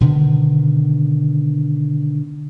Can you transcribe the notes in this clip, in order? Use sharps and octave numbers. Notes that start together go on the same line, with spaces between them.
B2 D3 D#3